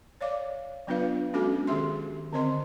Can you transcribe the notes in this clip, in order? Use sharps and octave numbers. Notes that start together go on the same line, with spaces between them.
C#5 D5 F5 D6
F#3 B3 D4 F4 B4 F5
G#3 C#4 D4 F#4 A4 D6
D#3 G4 G#4 E5 C6
D3 C4 C5 D#5 C6